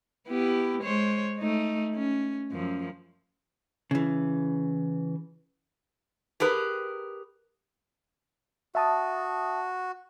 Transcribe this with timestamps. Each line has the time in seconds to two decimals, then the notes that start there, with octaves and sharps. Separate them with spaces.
0.28 B3 E4 G4
0.82 G#3 C5 C#5
1.39 A3 D#4
1.95 C#4
2.52 F#2 F3
3.91 C#3 E3
6.40 G4 G#4 A#4 B4
8.75 F#4 E5 A5 D#6